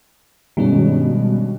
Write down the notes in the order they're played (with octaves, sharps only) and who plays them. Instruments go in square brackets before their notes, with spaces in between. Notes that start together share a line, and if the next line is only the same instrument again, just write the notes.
[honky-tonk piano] G2 B2 [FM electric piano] D#3 G#3 C#4